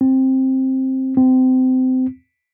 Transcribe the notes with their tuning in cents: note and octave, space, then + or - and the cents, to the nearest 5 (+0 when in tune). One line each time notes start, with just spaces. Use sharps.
C4 +10
C4 -25